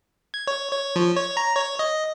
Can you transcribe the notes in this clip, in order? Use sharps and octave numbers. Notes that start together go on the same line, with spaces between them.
G#6
C#5
C#5
F3
C#5
A#5
C#5
D#5